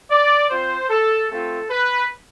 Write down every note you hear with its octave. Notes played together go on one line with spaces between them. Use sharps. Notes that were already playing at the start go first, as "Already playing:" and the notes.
D5
C4 F4 C5
A4
A3 C4 F4 A4
B4